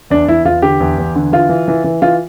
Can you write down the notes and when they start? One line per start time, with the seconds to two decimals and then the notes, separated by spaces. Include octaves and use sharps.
0.10 E2 D4
0.28 E2 E4
0.45 E2 F4
0.62 D3 G4
0.80 E2
0.98 E2
1.15 D3
1.32 E3 F4
1.49 E3
1.68 E3
1.84 E3
2.02 E3 F4